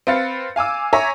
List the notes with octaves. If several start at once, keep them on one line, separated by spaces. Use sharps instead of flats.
C4 B4 F5 A6 C#7
F5 G#5 D6 E6
C#5 E5 G#5 A#5